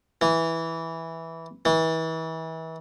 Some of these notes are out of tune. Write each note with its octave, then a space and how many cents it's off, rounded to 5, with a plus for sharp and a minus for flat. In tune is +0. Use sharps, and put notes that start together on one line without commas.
E3 -5
E3 -30